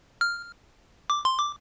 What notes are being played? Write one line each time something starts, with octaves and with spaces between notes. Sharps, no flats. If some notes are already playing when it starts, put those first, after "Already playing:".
F6
D6
C6
D6